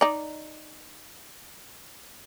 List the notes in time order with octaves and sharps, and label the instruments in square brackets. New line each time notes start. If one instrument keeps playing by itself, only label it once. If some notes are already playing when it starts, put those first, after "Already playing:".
[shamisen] D#4 D5